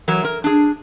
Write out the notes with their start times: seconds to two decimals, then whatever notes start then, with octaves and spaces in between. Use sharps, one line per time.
0.08 E3 F#3 A#4 C#5
0.24 A#4
0.44 D4 G#4